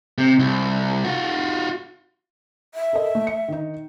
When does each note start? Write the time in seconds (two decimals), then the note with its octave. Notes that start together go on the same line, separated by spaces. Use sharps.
0.18 C3
0.39 C2
1.04 F4 F#4
2.75 E5
2.93 A4 A#4 D#5
3.15 A3
3.27 C#7
3.48 D#3 D#4